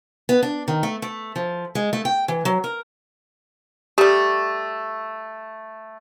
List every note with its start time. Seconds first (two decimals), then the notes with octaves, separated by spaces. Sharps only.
0.29 B3
0.43 D4
0.68 D#3
0.83 A3
1.02 A3
1.36 F3
1.75 G#3
1.93 A3
2.05 G5
2.28 E3
2.45 F#3
2.64 A#4
3.98 G3 A3 G4